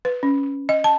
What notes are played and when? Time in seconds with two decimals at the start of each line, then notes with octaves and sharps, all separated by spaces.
0.05 B4
0.23 C#4
0.69 D#5
0.84 A5